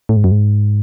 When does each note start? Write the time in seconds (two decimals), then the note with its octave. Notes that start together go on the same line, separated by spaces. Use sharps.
0.09 A2
0.16 G#2
0.24 F#2
0.31 G#2